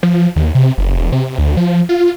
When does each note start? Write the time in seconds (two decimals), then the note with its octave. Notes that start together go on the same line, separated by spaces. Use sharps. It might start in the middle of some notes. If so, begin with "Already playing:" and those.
0.03 F3
0.36 D#2
0.55 C3
0.78 F#1
0.96 E1
1.12 C3
1.38 D2
1.57 F3
1.89 F4